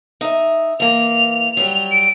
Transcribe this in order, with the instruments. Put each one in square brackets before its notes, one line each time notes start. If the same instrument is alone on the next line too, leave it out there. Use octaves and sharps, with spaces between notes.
[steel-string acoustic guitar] D#4 E5
[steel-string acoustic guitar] E3 A#3 [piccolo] F7
[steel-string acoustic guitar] F#3 G3
[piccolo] D7